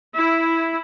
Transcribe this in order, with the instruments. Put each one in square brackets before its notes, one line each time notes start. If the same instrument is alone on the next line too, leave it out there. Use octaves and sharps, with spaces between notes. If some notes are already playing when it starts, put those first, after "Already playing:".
[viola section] E4